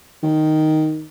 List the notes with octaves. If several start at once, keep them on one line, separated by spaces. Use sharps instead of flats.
D#3